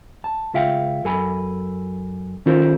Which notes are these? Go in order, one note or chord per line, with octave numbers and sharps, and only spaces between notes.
A5
C#2 F4 E5 F5 G5
F#2 A4 G#5 B5
D#3 C#4 F4 A4 C5